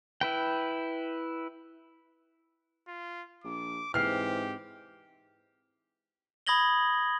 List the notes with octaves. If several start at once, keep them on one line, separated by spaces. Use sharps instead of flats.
E4 B4 G5
F4
A#1 D6
G#2 E3 C4 G4 F6 C7
B5 D#6 G#6 A#6 F#7 G7